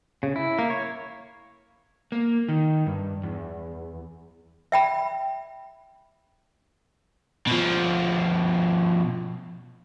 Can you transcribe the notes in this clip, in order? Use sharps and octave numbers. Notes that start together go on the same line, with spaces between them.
C#3
E4
A#3
C#5
A#3
D#3
G2
E2
E5 G5 B5
B2 F3